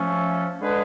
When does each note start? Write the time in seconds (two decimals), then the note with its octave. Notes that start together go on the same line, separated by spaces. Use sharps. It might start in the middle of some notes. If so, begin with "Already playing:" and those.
Already playing: F3 A3 C#4
0.60 D3 G#3 D4 G#4 B4